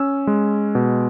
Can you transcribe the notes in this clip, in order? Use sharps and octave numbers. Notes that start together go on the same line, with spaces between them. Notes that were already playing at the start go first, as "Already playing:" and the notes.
Already playing: C#4 E6
G#3
B2